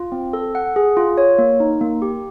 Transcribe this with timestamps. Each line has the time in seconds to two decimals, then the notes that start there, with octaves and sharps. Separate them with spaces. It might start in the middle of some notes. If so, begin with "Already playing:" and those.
Already playing: F4
0.12 C4
0.33 A4
0.55 F#5
0.76 G#4
0.97 F4
1.18 C#5
1.38 A#3
1.60 D#4
1.81 A#3
2.02 G4